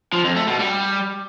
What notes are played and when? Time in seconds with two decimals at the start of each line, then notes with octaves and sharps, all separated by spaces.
0.13 F3
0.24 F2
0.36 A3
0.47 B2
0.59 G3